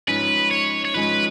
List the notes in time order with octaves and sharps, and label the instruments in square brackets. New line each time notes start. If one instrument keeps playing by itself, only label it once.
[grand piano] G#2 F3 G#3 C#4 [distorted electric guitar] B4
[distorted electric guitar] C#5
C#5
[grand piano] G#2 F3 G#3 C#4 [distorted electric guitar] B4